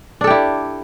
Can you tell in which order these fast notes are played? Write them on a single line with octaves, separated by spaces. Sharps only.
D4 A4 G4 E4